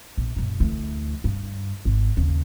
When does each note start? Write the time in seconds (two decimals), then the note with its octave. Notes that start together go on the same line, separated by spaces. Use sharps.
0.18 A#1
0.36 F#2 A#2
0.60 D2 E3
1.24 G2
1.85 G#1
2.17 D#2 C#3